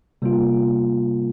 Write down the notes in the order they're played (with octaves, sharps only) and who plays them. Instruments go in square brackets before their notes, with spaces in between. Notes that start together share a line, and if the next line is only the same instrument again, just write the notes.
[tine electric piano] C3 G3 A#3 F4